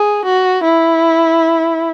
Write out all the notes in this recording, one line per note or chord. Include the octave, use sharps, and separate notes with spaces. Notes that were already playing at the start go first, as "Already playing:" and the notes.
Already playing: G#4
F#4
E4